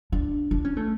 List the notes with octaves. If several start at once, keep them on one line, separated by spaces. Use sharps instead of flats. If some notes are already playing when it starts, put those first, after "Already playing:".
D4
D4
C#4
A3